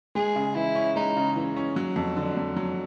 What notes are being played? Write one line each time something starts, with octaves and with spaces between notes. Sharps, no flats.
G#3 G#4
C#3
E3 E4
C#4
G#3 D#4
C#3
E3
C#4
F#3
F2
D3
F2
F#3